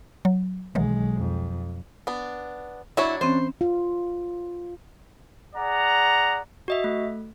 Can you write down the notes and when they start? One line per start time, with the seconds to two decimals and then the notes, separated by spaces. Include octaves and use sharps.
0.25 F#3
0.75 B1 D#3 E3 F#3 G#3
1.16 F2
2.07 B3 D4
2.97 F#3 D4 E4 C#5
3.21 E3 C4 C#4 C5
3.61 F4
5.55 G#4 D5 F#5 A#5
6.68 F#4 D#5 E5
6.84 A3